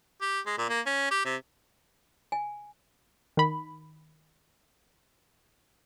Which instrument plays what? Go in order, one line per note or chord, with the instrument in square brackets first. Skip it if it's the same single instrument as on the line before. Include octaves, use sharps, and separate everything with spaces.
[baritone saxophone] G4
G#3
A#2
A#3
C#4
G4
C3
[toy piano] G#5
[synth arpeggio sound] D#3 B5